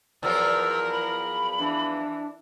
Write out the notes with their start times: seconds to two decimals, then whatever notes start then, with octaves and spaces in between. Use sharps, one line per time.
0.23 E2 F3 F#3 A#4 E6
0.91 B5
1.59 E3 D4